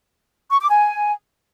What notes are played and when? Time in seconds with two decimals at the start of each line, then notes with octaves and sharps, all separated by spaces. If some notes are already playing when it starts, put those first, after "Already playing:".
0.51 C#6
0.61 D6
0.70 G#5